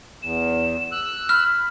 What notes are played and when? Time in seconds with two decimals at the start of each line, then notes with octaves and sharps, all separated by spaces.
0.23 E2 E7
0.92 E6 F#6
1.29 B5 F6